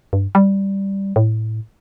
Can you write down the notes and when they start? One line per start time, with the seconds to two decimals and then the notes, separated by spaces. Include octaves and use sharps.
0.13 G2
0.35 G3
1.16 A2